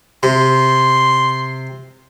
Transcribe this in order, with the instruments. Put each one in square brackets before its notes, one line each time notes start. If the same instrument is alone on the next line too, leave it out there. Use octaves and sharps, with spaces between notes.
[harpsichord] C3 [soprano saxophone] C6